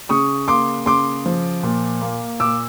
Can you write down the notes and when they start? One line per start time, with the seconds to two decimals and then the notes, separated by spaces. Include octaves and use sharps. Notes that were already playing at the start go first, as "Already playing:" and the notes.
0.09 C#3 C#6 D#6
0.48 A#3 C6 D6
0.86 C#3 C6 D6
1.26 F3
1.63 A#2
2.01 A#3
2.40 A#2 D6 E6